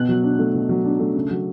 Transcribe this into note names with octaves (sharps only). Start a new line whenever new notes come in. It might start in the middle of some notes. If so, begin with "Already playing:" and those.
Already playing: B2 B3 F#6
F#3
D4
A3
B2
F#3
D4
A3
C#3
F#3